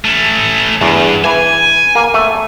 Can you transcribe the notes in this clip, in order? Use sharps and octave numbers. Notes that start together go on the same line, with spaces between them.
A3 C#4
E2 G2
E3 G#5
A#3
A3